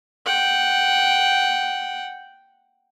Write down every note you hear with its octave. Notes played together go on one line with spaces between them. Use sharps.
F#5 G5